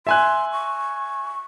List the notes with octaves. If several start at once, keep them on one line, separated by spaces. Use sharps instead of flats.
E5 G#5 C6 F#6
C#6